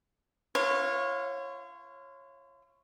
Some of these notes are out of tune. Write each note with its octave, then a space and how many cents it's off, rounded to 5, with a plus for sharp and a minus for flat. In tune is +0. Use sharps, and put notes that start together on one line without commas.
F4 -40 C#5 -20 F5 +30